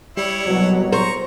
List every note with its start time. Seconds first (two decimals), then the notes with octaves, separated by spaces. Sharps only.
0.17 G3 E4 C#5
0.47 C2 B2 F#3 G3
0.93 C5 A#5 C#6